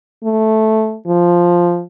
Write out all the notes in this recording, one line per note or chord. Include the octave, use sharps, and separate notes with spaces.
A3
F3